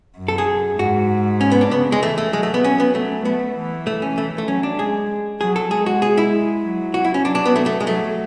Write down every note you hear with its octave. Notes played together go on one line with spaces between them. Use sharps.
F#2
A4
G#4
G#2 F#4
C#4
B3
D4
C#3 B3
G#3
E3 A3
A3
F#3 G#3
A3
B3
C#4
B3
A3
A3 B3
E3
A3
C#4
E3 A3
A3
F#3 C#4
D4
G#3 G#4
F#3 G#4
A4
G#3 G#4
F#4
G#4
E4
F#3
F#4
E4
C#4
F#3 D4
D4
B3
A3
A3
G#3
F#3 A3